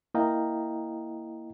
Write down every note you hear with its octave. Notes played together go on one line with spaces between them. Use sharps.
A#3 E4 D#5 F5 G5 A#5